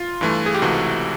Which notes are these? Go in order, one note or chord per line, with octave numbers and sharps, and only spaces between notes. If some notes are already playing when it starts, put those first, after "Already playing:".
Already playing: F4
G2 E3 A3
G#4
G4
C#2 C3 E3 A3 F#4